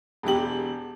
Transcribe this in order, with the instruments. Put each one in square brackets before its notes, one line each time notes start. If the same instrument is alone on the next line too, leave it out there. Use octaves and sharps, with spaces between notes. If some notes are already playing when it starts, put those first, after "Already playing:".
[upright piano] E1 E2 G4 F#7